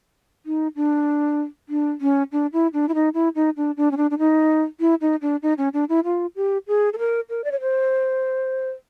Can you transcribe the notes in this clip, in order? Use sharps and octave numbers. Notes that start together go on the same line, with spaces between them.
D#4
D4
D4
C#4
D4
E4
D4
E4
D#4
E4
D#4
D4
D4
C#4
D4
D4
D#4
E4
D#4
D4
D#4
C#4
D4
E4
F4
G4
G#4
A4
A#4
A#4
D5
C#5
C5